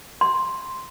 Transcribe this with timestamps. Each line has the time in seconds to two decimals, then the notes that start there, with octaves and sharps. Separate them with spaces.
0.21 C6